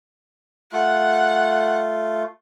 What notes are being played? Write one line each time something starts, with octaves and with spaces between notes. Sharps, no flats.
A3 F4 F#5